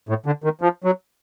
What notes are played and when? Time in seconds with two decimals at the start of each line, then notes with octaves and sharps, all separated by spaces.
0.09 A2
0.26 D3
0.44 D#3
0.61 F3
0.84 F#3